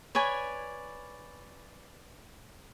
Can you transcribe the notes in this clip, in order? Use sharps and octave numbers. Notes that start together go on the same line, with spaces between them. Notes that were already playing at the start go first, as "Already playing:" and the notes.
B4 C#5 D5 G#5